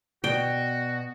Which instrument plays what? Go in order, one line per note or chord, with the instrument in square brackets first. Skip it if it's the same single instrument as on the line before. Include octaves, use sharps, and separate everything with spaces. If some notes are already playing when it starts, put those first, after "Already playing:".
[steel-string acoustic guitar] B2 [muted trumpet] F#4 [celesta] D5 [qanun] G5